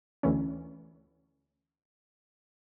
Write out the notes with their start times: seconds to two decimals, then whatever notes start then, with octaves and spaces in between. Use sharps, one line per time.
0.23 D2 E3 C#4